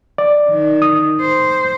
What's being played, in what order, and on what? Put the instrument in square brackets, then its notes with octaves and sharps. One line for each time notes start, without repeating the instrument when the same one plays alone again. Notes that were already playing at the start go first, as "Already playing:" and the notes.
[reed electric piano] D5
[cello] D#3
[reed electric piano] D#6
[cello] C5